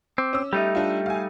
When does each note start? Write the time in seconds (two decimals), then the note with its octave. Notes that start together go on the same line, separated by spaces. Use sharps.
0.18 C4 D6
0.33 C#4 E6
0.53 G3 A3 D#4 G4 E5
0.75 D4 F4
1.06 F5 G#5